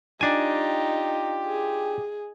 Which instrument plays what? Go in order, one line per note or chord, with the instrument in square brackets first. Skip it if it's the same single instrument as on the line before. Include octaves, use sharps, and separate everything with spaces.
[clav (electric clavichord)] D4 G#5 [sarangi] D#4 [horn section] F4 G4
[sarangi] G#4